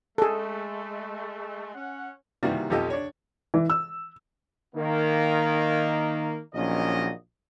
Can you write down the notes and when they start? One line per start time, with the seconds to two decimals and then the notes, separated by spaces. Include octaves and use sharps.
0.18 G#3 A3 G#4 A4
1.74 C#4 F#5
2.43 C3 D#3 E3 G3 A#3 F#4
2.70 B1 F2 F3 G4 A4 D#5
2.90 D4 C#5
3.54 E3
3.70 E6
4.75 D#3 A#3
6.55 A#1 D#3 F#3 C#4 D#5